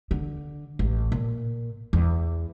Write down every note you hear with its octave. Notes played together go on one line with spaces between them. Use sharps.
D3
A1
A#2
E2